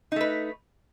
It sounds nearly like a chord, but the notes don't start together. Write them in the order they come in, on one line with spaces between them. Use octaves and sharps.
D#4 A3 B4